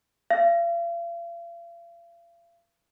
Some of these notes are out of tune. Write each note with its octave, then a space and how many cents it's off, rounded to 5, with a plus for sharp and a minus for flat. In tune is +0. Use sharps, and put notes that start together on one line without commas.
F5 -40